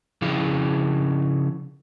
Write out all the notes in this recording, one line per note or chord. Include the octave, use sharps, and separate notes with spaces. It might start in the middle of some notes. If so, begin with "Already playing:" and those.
C#3 F3 E4 G#4 F5